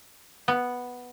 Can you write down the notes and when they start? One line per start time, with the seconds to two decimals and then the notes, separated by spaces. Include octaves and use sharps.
0.48 B3